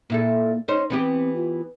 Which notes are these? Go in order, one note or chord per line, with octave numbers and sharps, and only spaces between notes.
A#2 A#3 E4 A4
C#4 D#4 C5 C#5
E3 B3 C4 G4
F4